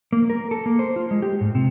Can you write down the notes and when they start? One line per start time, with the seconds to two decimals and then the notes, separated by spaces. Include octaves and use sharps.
0.13 A#3
0.30 A#4
0.51 A4
0.66 A#3
0.79 C5
0.96 F4
1.11 G#3
1.22 G4
1.41 G#2
1.55 C3